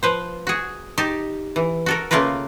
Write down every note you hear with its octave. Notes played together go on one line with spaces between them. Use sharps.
F3 B4 C5
F#4 G#4
D#4 G4 A5
E3
F#4 A4 A#4
C#3 A3 A#3 F4 A#4 B4